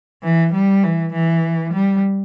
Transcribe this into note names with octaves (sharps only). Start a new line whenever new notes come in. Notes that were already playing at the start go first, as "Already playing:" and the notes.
E3
G3
E3
E3
G3